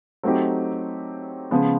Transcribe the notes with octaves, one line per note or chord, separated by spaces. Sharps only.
F#3 A3 C4 D#4 G4
C#3 F3 G#3 B3